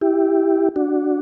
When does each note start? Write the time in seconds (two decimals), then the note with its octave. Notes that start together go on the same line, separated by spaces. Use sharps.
0.01 E4 G4
0.76 D4 F#4